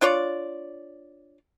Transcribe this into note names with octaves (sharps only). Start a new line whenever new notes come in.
D4 F4 C#5 D5